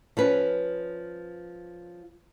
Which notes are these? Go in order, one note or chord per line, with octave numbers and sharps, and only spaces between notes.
F3 C#4 B4